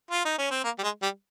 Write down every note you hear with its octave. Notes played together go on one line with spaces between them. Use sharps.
F4
D#4
C#4
C4
A#3
G3
G#3
G3